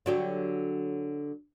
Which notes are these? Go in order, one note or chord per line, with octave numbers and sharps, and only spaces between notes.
D3 F#3 G4